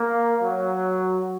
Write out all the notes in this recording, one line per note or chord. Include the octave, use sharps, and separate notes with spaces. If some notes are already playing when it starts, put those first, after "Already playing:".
Already playing: A#3
F#3